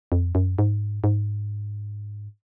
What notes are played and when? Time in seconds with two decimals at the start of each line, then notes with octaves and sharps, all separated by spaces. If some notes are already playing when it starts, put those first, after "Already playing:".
0.12 F2
0.35 F#2
0.59 G#2
1.04 G#2